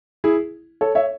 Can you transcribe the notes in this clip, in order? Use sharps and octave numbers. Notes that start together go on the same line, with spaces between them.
E4 G#4
A4 C#5
C#5 E5